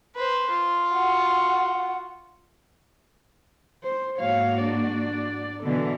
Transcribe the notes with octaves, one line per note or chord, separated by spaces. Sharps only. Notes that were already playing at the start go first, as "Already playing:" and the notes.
B4 C5
F4
F#4 F#5
C5
G#2 A#3 F#4 C#5 F5
D4 D5
B2 D3 E3 A4